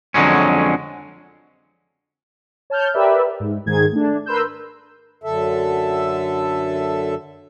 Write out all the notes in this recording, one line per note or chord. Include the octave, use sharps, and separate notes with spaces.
F2 D3 F#3 G#3 C#4
C#5 A5 F6 G6
G4 A#4 B4 D5 E5
G#2
G#2 D#3 G#4 G#6
A3 D4
A#4 B4 C6 E6 G6
F#2 D3 A4 E5